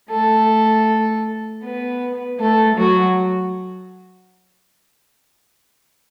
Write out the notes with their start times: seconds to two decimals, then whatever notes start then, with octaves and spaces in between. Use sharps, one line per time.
0.11 A3 A4
1.63 B3 B4
2.39 A3 A4
2.78 F#3 F#4